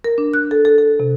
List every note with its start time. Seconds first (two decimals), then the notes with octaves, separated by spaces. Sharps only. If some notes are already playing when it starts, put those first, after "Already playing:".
0.04 A#4
0.18 D4
0.34 F#6
0.51 A4
0.65 A4
0.78 A4
1.00 C3